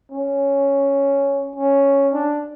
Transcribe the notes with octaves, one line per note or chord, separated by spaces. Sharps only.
C#4
C#4
D4